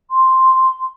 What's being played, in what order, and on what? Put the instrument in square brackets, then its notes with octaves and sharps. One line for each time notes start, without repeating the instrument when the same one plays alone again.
[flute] C6